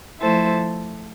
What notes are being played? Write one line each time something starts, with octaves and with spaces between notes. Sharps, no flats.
F3 A3 E4 A4 C5